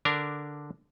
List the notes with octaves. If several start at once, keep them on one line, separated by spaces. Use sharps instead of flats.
D3 D4 A#4